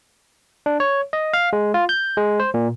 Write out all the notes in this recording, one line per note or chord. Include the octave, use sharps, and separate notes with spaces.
D4
C#5
D#5
F5
G#3
F4
G6
G#3
C5
A#2